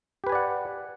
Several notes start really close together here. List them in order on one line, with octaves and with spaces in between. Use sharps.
G4 B4 G#5 D5 F#5